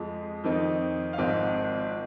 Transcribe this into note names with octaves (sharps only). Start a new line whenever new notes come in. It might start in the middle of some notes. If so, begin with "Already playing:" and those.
Already playing: F2 F3 G#3
F2 D#3 C4 D#4
F5
G#1 G#2 F3 C4 D#5